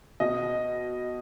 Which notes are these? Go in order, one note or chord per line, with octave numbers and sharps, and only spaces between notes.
B2 D#5